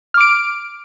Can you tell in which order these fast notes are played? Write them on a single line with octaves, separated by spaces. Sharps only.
F6 D6 D7